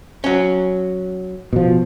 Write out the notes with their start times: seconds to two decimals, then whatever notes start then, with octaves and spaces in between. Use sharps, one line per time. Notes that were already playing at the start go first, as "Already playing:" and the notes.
0.24 F#3 C#4
1.53 B2 F3